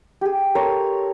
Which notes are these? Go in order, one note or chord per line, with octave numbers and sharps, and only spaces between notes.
G4 G#4
A4 A#4 C#5 C6